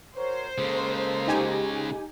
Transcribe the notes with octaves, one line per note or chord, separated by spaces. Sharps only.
F#4 A#4 C5 C#5
C#3 G#3 A#3 A4
D#4 G4 G#5